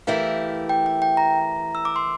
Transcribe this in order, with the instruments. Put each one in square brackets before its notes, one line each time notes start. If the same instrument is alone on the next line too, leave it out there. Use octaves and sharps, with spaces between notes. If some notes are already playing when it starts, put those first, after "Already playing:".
[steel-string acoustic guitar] E3 A3 E4 G4 A#4 [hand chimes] F5
[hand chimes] G5
G5
G5
A#5
E6
D6
C6